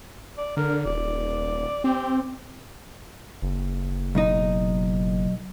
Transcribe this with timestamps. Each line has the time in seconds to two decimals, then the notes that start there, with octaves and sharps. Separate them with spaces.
0.38 D5
0.57 D3 A#4
0.86 D#1 D5
1.84 C4 G4
3.42 F#1
4.15 B1 D#4